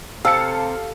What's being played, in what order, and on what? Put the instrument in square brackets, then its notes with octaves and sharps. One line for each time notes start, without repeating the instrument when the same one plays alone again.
[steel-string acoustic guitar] C3 [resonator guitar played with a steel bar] A4 [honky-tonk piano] F5 A5 C#7 [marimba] E6